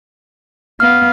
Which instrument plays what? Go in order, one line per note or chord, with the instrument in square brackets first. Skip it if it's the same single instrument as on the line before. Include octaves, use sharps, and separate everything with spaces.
[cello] B3 F5 [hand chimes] F6